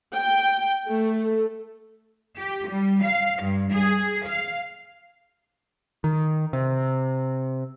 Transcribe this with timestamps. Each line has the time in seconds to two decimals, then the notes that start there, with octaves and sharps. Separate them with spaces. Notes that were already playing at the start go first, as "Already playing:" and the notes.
0.13 G5
0.88 A3
2.38 G4
2.70 G3
3.05 F5
3.43 G2
3.74 G#4
4.28 F5
6.04 D#3
6.53 C3